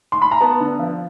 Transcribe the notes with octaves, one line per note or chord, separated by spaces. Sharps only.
C6
B5
A#5
B3 A5
D3
F3